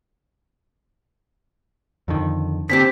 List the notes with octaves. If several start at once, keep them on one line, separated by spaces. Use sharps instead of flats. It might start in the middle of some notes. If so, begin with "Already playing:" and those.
F2 D3 D#3
D3 C4 G4 B6